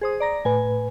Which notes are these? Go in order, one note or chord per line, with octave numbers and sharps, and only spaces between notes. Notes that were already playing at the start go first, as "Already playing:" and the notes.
G#4 C5 D#6
D5 A#5 A#6
A2 B4 G#5